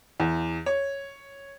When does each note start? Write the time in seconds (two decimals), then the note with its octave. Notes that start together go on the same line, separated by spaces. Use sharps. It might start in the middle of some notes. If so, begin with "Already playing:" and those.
0.20 E2
0.66 C#5